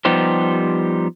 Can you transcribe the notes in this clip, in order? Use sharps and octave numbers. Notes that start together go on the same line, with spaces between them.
F3 G3 B3 D#4 G4 C5